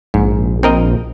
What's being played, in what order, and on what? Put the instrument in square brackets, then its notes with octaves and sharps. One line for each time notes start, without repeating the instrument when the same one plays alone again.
[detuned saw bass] A#1 [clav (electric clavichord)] G#2
[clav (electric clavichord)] C4 A#4 D#5